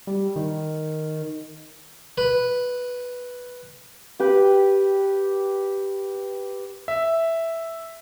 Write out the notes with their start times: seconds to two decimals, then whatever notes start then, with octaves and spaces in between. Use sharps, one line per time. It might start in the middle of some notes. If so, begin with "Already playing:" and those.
0.07 G3
0.36 D#3
2.18 B4
4.20 G4 B4 G5
6.88 E5